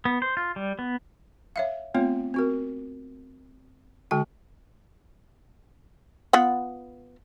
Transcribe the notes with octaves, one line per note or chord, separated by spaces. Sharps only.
B3
C5
F4
G3
B3
C#5 E5 F5
A3 B3 C4 F4 C#5
C4 F#4 A#4
D3 G#3 F#4 G5
B3 F4 F#5